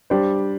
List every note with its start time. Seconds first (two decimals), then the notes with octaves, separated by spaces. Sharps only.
0.10 G3 D4 G4 C5